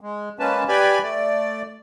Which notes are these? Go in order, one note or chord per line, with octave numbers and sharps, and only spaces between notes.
G#3
G#3 A#3 C#4 B4 A5
G4 B4 D5 G#5 B5
A3 D5